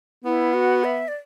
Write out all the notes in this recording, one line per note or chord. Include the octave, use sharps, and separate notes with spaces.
B3 E4
F#4
E5
D5